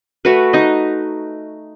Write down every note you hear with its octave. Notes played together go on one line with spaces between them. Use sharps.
A3 F#4 B4
D#4 D#5